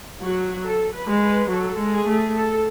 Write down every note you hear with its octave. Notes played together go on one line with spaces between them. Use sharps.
F#3 F#4
A4
B4
G#3
B4
F#3 A4
G#3
G#4
A3
A4